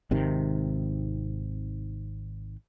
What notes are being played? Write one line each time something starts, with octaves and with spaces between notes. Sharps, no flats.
G#1 C3 D#3